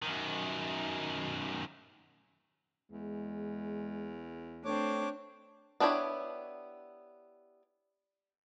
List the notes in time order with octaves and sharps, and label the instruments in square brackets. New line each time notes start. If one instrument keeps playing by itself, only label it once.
[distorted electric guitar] F#2 D#3
[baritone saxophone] E2 [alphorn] G#3
[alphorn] A3 [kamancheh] C4 D4 [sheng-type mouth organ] C#5 D6
[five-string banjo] B3 D4 E4 G4 C#5